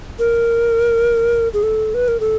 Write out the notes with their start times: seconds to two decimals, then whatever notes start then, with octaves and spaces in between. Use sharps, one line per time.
0.19 A#4
1.53 G#4
1.63 A4
1.94 B4
2.08 A#4
2.20 A4